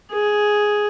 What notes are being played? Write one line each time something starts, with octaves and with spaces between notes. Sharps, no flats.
G#4